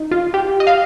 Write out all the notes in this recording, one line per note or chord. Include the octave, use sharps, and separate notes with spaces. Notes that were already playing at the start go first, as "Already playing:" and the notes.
Already playing: D#4
F4
G4
D#5
F5